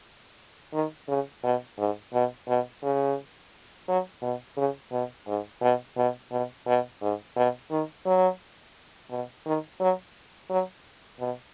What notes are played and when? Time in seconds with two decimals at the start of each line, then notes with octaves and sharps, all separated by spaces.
0.74 D#3
1.09 C#3
1.44 B2
1.79 G#2
2.14 B2
2.48 B2
2.83 C#3
3.88 F#3
4.22 B2
4.57 C#3
4.92 B2
5.27 G#2
5.62 B2
5.97 B2
6.32 B2
6.67 B2
7.02 G#2
7.36 B2
7.71 D#3
8.06 F#3
9.11 B2
9.46 D#3
9.80 F#3
10.50 F#3
11.20 B2